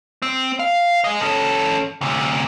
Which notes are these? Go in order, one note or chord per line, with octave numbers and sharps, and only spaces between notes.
C4
F5
G#4 D#5
C#4 A4
D2 C3